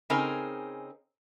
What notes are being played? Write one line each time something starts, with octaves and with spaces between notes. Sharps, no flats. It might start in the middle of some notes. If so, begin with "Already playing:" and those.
C#3 C4 D#4 G#4 A#4